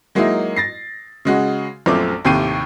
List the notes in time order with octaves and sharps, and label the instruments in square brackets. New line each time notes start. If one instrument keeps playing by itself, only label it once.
[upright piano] F#3 G#3 A#3 D#4 E4
A6 A#6 C7
C#3 G#3 F#4
A#1 F#2 A3 C4 F4 D6
D#2 A2 C3 G5 C7 D#7